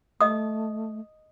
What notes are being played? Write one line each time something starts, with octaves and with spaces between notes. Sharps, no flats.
A3 D#5 D#6